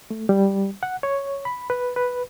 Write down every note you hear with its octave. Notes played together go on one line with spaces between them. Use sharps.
A3
G3
F#5
C#5
B5
B4
B4